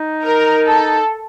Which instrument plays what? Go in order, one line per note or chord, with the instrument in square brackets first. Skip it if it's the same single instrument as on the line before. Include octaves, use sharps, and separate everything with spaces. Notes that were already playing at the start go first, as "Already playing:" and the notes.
Already playing: [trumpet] D#4
[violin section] A#4
A4